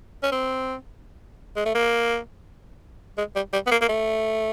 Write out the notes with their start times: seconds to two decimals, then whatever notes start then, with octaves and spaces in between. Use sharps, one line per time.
0.23 C#4
0.32 C4
1.56 G#3
1.66 A3
1.75 A#3
3.18 G#3
3.36 G3
3.53 G3
3.67 B3
3.71 A#3
3.82 A#3
3.89 A3